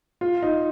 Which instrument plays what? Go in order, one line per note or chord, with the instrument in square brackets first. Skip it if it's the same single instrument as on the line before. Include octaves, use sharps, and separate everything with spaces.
[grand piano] F4
D#4